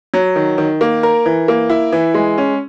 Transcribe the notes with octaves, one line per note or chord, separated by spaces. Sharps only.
F#3
D#3
D#3
A#3
A#4
E3
A#3
E4
E3
G#3
C#4